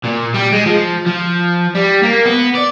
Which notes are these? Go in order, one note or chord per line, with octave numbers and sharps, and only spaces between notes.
A#2
G3
G#3
F3
F3
G3
A#3
B3
D5